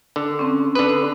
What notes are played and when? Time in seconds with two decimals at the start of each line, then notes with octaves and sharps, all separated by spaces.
0.16 D3
0.39 C4 C#4
0.75 D3 B4 D#6